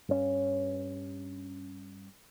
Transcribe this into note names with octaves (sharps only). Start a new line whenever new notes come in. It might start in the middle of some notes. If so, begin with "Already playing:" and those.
G2 C#4